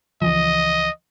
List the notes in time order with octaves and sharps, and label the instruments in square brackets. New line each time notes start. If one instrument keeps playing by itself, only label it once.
[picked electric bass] C#2 E3 F3 [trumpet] D#5